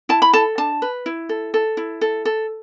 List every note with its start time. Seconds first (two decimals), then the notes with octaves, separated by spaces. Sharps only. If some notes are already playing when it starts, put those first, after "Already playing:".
0.09 E4 A5
0.22 B5
0.33 A4 A5
0.58 D4 A5
0.82 B4
1.06 E4
1.29 A4
1.54 A4
1.77 E4
2.01 A4
2.25 A4